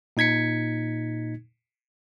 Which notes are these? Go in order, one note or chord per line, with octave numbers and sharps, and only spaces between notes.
A#2 D#4 G#6 B6 C#7